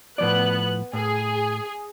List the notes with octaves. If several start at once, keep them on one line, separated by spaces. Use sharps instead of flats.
A2 F3 B3 D5 F#6
A2 G#4